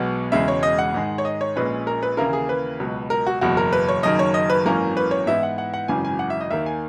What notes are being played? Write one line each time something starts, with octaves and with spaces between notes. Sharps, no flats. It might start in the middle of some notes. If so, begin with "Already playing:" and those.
Already playing: B1 B2 G#3 B3 F#5
E1 E2 C#3 G#3 E5
C#5
D#5
F#5
G#2 D#3 G#3 D#4
C#5
D#5
C#5
A#1 A#2 G#3 C#4 B4
A#4
B4
D#2 C#3 E3 A#3 E4 A#4
G#4
B4
C#2 B2 F#3
A#4
F#4
F#1 E2 B2 F#4
A#4
B4
C#5
F#1 F#2 D#3 D#5
C#5
D#5
B4
G#1 F#2 E3 A#3 C#4 A#4
B4
C#5
G#2 E3 B3 E4 E5
F#5
F#5
F#5
G#1 F#2 C#3 E3 G#5
G#5
F#5
E5
D#5
D#2 D#3 A#3 E5
G#5